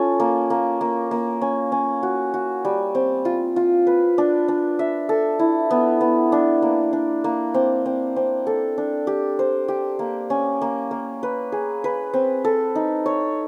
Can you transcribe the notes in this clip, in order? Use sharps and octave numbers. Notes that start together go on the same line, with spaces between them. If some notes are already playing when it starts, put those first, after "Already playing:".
Already playing: C#4 F4 A4
A#3
A#3
A#3
A#3
C#4
C#4
F#4
F#4
G3
C4
F4
F4
B4
D4
D4
E5
A4
E4
B3
B3
D4
A#3
D4
A#3
C4
C4
C4
A4
D4
G4
C5
G4
A#3
C#4
A#3
A#3
B4
G#4
B4
C4
A4
D#4
C#5